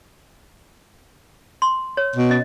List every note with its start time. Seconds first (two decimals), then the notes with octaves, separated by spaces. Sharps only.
1.62 C6
1.97 C#5
2.16 B2
2.30 C#4 D#5